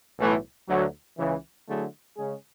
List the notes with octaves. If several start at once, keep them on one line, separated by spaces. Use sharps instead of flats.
B1 A2 E3 A3
D2 D3 F#3
C#2 C#3 E3
D3 F#3 A3 E4 G#4
C#3 G#3 C#4 G#4